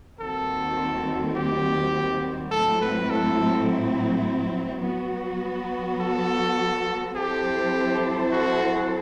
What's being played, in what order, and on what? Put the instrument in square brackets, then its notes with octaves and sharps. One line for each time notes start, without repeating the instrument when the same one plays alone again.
[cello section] D#2 D#3 G3 C4 F#4 [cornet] A4
[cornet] G4
[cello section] A2 F#3 C4 E4 [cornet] A4
[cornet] B4
A4
[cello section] F#3 B3 F#4
[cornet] A4
[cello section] F#3 C4 E4 A4 C5 [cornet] G4
[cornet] F#4